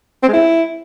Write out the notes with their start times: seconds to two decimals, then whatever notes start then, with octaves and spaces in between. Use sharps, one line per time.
0.23 C4
0.28 G#3
0.33 E4